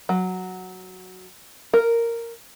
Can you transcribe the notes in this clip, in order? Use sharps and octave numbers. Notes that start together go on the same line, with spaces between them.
F#3
A#4